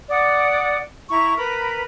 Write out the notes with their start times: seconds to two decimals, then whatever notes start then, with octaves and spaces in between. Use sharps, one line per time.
0.10 D5 F#5 D#6
1.10 E4 A#5 C#6
1.37 A#4 B4 A#5 B5